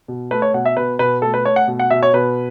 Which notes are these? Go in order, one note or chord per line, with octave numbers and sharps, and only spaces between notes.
B2
A3 B4
C#5
B2 F#5
E5
B2 B4
B2 B4
A3 A4
B4
A3 C#5
F#5
B2
F#5
B2 E5
C#5
B2 B4